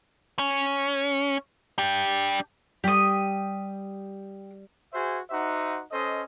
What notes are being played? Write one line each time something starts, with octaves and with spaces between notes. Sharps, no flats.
C#4
D4 G4
G3 G4 D#6
F#4 G#4 C5 E5 G#5
D#4 F#4 C5 E5 F#5
C#4 A4 C5 D#5